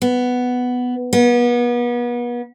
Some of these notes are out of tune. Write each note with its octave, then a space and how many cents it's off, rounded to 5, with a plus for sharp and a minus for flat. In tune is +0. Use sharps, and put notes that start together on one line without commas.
B3 +5
B3 -35